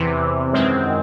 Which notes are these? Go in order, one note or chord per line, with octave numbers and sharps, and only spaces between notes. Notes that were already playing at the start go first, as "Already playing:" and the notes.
Already playing: E2 C3 E3
F#2 D#3 G#3 C4